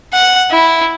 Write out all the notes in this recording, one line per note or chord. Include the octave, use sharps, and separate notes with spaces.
F#5
E4